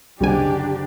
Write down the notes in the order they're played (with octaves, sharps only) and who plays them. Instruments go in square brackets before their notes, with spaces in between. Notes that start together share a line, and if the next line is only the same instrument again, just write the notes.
[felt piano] F#1 D3 F#4 [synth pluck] C2 G#5 [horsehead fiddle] D4 G4